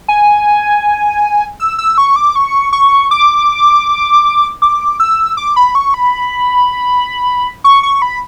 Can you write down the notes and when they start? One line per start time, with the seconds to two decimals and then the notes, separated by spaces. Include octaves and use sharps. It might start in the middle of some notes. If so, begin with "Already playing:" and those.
0.08 G#5
1.60 E6
1.78 E6
1.98 C#6
2.16 D6
2.36 C#6
2.73 C#6
3.11 D6
4.62 D6
5.00 E6
5.37 D6
5.56 B5
5.75 C#6
5.94 B5
7.64 C#6
7.83 C#6
8.02 B5